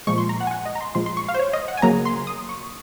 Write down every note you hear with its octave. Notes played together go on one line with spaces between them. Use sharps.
A#2 F3 G#3 C#6
C6
A#5
F#5
G#5
F#5
D#5
A#5
C6
A#2 F3 G#3 C6
C6
C#6
F5
C5
C#5
D#5
F#5
G#5
C#3 F#3 A#3 A#5
C6
D#6
C#6